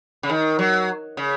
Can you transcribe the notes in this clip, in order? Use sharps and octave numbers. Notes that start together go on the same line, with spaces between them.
C#3
D#3
F#3
C#3